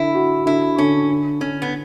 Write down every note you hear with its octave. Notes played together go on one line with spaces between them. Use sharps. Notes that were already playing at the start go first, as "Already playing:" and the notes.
Already playing: D3 E4
F#4
D3 E4
D3 C#4
D3
D3 C#4
B3